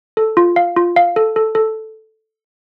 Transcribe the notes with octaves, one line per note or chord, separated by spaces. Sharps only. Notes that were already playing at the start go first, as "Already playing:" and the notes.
A4
F4
F5
F4
F5
A4
A4
A4